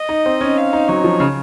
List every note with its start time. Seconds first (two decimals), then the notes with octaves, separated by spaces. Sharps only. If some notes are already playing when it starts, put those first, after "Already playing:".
Already playing: D#5
0.09 D#4
0.26 C4
0.41 C#4
0.57 F5
0.73 D#4
0.88 F#3 C#5
1.04 F3
1.20 C#3